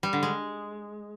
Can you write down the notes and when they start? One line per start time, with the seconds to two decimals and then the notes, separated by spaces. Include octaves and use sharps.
0.03 G3
0.13 D3
0.23 G#3